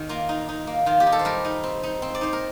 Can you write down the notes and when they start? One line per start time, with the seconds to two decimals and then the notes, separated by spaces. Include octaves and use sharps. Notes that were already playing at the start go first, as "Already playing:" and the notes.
Already playing: D#3
0.09 A#3 F4
0.29 D#4
0.49 D#4
0.67 A#3
0.86 D#3 F4
1.00 G4
1.07 D#4
1.12 A4
1.19 C5
1.25 G3 A#4
1.45 D#4
1.64 C4
1.83 D#4
2.02 C4
2.15 D5
2.21 D#4 C5
2.33 A#4